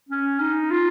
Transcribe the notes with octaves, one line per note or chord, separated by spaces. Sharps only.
C#4
D#4
F4